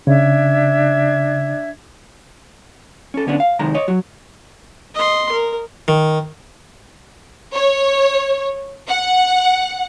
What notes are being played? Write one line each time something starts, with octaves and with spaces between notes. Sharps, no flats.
C#3 D4 E5 G#6
C#4 A4
D3 B3 C#4 D4
F5
C3 D#3 G#3 A#5
C#5 D#5
F#3 F#4
D#5 C6
A#4
D#3
C#5
F#5